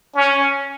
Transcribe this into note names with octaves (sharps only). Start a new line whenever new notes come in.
C#4